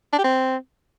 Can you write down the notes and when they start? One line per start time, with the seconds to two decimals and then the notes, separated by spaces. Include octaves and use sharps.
0.13 D4
0.18 G4
0.24 C4